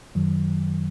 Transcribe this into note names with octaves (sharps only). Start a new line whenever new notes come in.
F#2 D#3 F#3